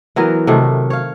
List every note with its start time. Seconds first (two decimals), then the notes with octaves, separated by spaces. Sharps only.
0.16 E3 F#3 B3 A#4
0.47 C3 D#3 F#3 A3
0.90 C#5 F5